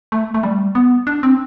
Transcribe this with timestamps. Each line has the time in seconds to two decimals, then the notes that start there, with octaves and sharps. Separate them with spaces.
0.12 A3
0.34 A3
0.43 G3
0.75 B3
1.07 D4
1.23 C4